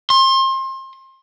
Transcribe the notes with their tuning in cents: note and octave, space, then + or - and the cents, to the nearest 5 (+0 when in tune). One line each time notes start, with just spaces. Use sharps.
C6 +30